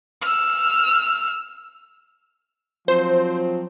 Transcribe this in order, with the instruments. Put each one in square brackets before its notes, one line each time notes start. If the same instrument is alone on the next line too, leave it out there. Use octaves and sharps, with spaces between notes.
[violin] E6 F6
[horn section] F3 F#3 C4 [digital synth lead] C5